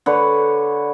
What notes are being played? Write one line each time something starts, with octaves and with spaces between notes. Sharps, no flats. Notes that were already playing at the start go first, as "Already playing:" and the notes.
D3 B4 C#5